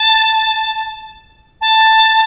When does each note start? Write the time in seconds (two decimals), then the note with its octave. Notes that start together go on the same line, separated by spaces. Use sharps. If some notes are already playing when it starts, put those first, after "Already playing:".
Already playing: A5
1.61 A5